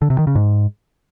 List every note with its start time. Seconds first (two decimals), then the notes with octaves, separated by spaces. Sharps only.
0.02 D3
0.10 C3
0.19 D#3
0.27 C#3
0.35 G#2